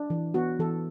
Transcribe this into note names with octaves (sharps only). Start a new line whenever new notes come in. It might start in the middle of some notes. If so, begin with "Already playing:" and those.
Already playing: D4
E3
B3 F#4
E3 A4